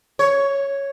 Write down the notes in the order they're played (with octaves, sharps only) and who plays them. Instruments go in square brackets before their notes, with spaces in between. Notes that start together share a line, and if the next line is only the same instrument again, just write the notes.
[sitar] C#5